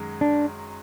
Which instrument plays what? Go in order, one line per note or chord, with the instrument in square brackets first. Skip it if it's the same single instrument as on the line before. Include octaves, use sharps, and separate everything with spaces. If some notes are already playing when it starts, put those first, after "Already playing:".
Already playing: [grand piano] F#2 D#3 G#3
[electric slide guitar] D4